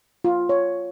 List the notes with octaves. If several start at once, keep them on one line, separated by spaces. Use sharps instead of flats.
F4
C#5